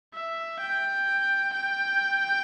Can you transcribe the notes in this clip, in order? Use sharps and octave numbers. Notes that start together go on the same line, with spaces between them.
E5
G5
G5